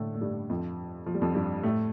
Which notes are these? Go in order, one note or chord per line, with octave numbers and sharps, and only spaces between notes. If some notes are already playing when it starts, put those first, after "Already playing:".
Already playing: A2 D3 A3 D4
A3
G2 G3
F2 F3
F3
G3
F2 F3
G2 G3
A2 A3